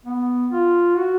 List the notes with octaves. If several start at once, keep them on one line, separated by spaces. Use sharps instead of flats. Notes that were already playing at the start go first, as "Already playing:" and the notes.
B3
F4
F#4